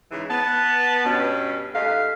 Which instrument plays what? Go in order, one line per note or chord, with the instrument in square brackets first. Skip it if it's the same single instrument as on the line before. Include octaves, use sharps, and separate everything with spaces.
[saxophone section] G#2 C#3 E3
[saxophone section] B3 [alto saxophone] A5
[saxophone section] G2 B2 C#4
[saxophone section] D#2 A3 D#5 [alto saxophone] F5